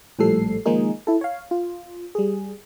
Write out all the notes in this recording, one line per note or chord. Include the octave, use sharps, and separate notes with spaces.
A#1 A2 F3 G3 A4 C7
D#3 F3 G#3 A#3 D#4 G#4
E4 A4
C#5 F5
F4
G3 G#4